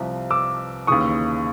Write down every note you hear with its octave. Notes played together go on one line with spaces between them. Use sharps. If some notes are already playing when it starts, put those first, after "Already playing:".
Already playing: C2 C3 F3
D6 E6
D#2 C#3 E3 C#6 D#6